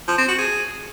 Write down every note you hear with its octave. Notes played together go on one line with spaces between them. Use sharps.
F3
C4
F#4
G#4